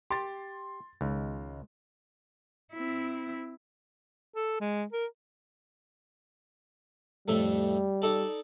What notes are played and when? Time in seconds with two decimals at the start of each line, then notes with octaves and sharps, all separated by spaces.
0.10 G4 C6 A6
1.01 C#2 D#3 G#3
2.74 C4 E4
4.34 A4
4.60 G#3
4.92 A#4
7.28 F2 A2 G3 A3
8.02 D#4 A4 D5